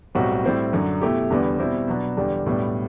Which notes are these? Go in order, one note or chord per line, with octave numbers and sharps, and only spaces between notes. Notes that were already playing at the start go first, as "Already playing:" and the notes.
B1 A2 G3 C4 F#4
A2 G3 C4 E4
F#2 D3 F#3
B2 A3 E4 G4
E2 D3 G3 B3
B2 G3 C4 E4
B2 F#3 B3 D4
E2 D3 G3 D4 G4
B1 A2 G3 B3 D4